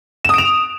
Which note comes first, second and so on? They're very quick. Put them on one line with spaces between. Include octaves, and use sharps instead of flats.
E7 D#6 D7 F7